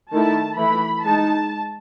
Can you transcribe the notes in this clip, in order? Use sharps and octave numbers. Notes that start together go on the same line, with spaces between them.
D#3 A3 E4 A5
E3 A3 E4 B5
G#3 D#4 A5